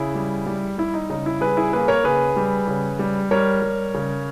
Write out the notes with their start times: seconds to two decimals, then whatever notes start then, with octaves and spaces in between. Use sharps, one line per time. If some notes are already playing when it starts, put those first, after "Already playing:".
Already playing: C#3 E4 G#4
0.15 G3
0.46 G3
0.78 G3 E4
0.94 D#4
1.10 C#3 D#4
1.26 E4
1.41 G3 G#4 B4
1.57 E4 G#4
1.73 A#3 G#4 B4
1.88 A#4 C#5
2.04 C#3 G#4 B4
2.36 G3
2.68 C#3
2.99 G3
3.31 G3 A#4 C#5
3.62 G3
3.94 C#3